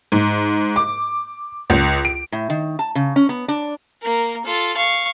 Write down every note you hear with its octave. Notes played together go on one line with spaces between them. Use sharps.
G#2
D6
C#2
D7
A2
D#3
A5
C#3
C#4
B3
D4
A#3 A#4
F4 A4
F5 C#6